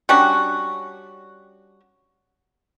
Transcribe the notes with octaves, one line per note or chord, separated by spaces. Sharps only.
G3 C#4 D4 F#4